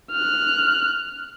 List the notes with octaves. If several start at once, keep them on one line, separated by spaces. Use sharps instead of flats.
F6 F#6